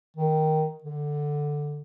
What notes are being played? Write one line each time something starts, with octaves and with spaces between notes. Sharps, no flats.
D#3
D3